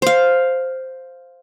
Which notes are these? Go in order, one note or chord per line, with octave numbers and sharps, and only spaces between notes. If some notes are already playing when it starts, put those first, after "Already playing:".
C5 F5